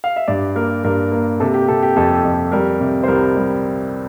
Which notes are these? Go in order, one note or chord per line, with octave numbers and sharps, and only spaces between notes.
F5
E5
G2 D5
A#3 A#4
G2 A#4
A#3
C3 A4
G4
C3 A4
G4
F2 A4
F2
G3 A#4
C3
C5
C2 A#4
G3